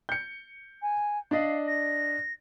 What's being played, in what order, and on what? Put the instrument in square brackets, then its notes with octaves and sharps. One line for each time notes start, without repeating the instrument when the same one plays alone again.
[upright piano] G6 C#7
[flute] G#5
[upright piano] D4 D5 D#5 [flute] F5
[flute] A#6